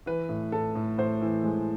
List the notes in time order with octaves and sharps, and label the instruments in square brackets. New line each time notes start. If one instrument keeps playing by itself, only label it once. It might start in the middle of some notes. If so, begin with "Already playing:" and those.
[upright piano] E3 B4
A2
A2 A4
A2
A2 C5
E3
G#3